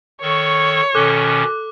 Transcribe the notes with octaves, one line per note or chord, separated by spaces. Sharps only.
D#3 A4 C#5 C#6
B2 D#3 C#4 A4 D6 F#6 G7